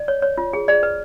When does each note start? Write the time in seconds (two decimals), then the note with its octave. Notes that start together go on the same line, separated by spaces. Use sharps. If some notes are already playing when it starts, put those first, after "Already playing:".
Already playing: D5
0.08 C#5
0.22 C#5
0.37 F4
0.53 G#4
0.68 G#4 D5
0.83 B4